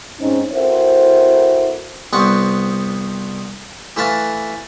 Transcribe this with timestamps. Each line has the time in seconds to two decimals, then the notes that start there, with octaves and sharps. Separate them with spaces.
0.20 G#2 C4 C#4 D#4
0.52 C4 E4 F#4 A4 A#4 C5
2.13 C2 B3 C4 F#5 C#6
3.97 E3 A3 B4 F5 A5